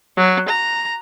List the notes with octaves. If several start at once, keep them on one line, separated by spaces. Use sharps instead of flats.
F#3
A#5